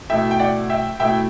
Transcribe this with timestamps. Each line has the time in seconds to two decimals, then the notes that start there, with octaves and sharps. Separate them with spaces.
0.10 B2 A3 E4 E5 G5
0.31 G5
0.40 D5 F#5
0.69 E5 G5
1.00 B2 A3 E4 E5 G5